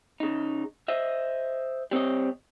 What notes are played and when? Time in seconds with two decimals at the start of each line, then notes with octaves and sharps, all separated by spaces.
0.20 C#3 D#4
0.88 C5 D#5 E5
1.91 G3 C4 C#5 D#5